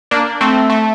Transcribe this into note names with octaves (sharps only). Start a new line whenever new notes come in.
A#3 D4
A3 C4
A3